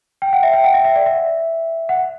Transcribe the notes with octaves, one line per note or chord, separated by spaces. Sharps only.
G5
F#5
E5
G5
F#5
E5
E5
D5
E5
F#5